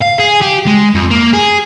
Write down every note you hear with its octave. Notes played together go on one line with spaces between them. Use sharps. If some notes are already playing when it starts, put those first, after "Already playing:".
F5
G#4
G4
G#3
F2
A#3
G#4